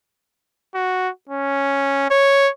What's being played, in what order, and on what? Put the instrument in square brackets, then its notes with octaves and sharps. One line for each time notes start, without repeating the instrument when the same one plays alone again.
[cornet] F#4
C#4
C#5